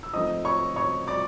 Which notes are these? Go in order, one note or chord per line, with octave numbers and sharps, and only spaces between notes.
E6
G#2 F3 A3 C4 D#4 D#5 D#6
C#5 C#6
C#5 C#6
D5 D6